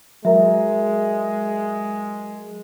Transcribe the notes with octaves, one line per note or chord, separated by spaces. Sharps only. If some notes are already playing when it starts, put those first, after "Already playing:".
F#3 G#3 A#4 E5